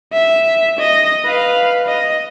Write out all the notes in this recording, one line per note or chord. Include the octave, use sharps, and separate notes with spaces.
E5
D#5
B4 F5
D#5